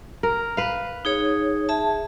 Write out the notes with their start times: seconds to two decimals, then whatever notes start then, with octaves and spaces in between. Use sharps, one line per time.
0.23 A#4
0.57 B4 F5
1.05 D#4 G#4 C#5
1.69 G#4 E5 A5